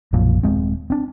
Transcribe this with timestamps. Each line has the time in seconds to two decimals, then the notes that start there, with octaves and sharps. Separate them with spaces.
0.13 B1 F#2 A#2 F3
0.43 D#1 F2 G#3 C4
0.90 C4 D4